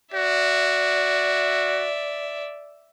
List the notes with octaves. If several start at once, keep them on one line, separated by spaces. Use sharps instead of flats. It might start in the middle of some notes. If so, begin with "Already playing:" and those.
F#4 D5 E5